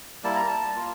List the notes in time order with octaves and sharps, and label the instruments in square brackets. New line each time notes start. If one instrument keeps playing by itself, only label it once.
[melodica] G3 A#3 E4 A5
A#5
A5
A#3 F4